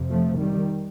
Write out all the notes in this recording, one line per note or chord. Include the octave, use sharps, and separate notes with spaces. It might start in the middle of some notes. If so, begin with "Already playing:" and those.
Already playing: F2 C3
F3 A3
D#3 G3